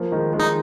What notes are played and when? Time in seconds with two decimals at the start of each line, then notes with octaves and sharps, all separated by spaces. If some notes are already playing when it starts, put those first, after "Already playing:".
Already playing: F3 A#3
0.12 D#3 G#3
0.33 D#3 G#3
0.40 D#4